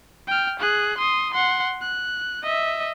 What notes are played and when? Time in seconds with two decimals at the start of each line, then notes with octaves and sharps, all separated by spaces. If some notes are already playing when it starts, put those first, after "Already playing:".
0.27 G5 F6
0.60 G#4 F#6
0.98 C6 D#6
1.34 F#5 C6
1.82 F#6
2.43 D#5 E5